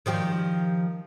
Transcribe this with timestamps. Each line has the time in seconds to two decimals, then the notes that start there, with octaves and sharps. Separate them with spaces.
0.06 D#3 F3 G4